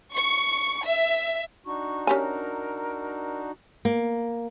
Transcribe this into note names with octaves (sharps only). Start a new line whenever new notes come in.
C#6
E5
D4 D#4 F#4 C#6
C#4 G4 A#4 G#5
A#3